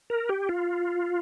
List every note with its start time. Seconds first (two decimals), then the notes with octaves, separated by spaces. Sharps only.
0.10 A#4
0.29 G4
0.49 F4